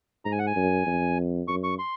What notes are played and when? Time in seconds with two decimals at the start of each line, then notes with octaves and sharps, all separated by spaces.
0.25 G#2 A#5
0.32 G#5
0.39 F#5
0.47 G#5
0.56 F#2
0.86 F2
1.48 F#2 C#6
1.64 C#6
1.79 C6